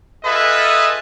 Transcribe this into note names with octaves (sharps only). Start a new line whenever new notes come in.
F4 G#4 A4 B4 D#5 E5